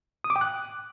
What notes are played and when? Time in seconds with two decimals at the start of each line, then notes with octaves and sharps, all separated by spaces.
0.24 D#6
0.30 D6
0.36 G5
0.41 F#6